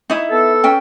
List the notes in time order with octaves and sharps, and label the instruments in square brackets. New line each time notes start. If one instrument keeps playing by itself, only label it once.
[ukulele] D#4 E4
[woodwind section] B3 A4
[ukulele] C#4 G5